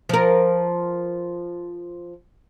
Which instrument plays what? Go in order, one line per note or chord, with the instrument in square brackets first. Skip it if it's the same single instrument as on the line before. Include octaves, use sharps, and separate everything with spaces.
[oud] F3 A#4